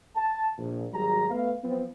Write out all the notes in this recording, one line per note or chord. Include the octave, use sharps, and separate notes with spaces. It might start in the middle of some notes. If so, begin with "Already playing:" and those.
A5
A#1
G#1 F#3 G3 G4 G#4 A#5
A3 B3 B4 F5
F3 F#3 B3 C4